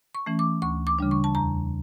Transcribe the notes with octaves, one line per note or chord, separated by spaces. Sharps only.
C#6
E3 A3 C#4
D6
D2 C#6
D6
C#3 G3 D4
C#6
A5
E2 A#5